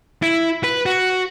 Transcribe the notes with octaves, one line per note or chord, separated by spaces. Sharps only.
E4
B4
F#4